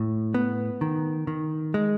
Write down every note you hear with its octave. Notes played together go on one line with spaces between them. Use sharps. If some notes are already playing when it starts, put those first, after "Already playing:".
Already playing: A2
B3
D#3
D#3
G#3